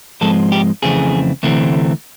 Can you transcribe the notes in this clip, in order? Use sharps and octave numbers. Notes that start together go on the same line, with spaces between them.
G#2 F3 G#3 C4 A4
G4
F2 C#3 E3 A3 C4 G#4
D2 C3 E3 A3 C4